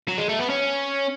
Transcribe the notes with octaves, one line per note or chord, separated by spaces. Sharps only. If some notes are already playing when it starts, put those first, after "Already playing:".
F#3
G#3
A3
B3
C#4